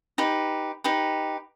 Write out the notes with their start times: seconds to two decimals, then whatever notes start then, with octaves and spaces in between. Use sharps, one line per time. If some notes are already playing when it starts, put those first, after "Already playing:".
0.18 D#4 G4 B4
0.84 D#4 G4 B4